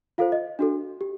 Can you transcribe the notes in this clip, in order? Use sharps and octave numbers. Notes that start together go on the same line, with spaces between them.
F4 A4 C5 F5
D#5
D4 F#4 A4
G4